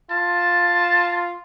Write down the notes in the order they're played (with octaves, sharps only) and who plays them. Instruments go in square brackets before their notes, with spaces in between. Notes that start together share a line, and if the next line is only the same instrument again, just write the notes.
[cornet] F4 [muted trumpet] A5